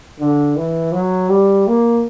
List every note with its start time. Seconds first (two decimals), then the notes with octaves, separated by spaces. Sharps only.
0.19 D3
0.56 E3
0.92 F#3
1.29 G3
1.67 A#3